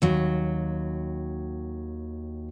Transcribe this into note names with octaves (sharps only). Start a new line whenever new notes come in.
D#2 F#3